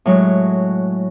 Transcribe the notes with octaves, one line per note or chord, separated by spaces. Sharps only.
A2 F#3 G#3